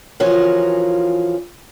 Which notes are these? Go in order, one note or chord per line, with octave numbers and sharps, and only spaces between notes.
E3 F3 C#4 F4 F#4 A#4